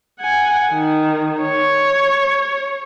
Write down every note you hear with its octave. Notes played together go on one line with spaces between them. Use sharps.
F#5 G#5
D#3
C#5